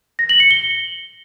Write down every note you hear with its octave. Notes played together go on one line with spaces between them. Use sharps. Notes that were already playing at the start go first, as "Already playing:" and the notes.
A#6
F#7
C#7
G7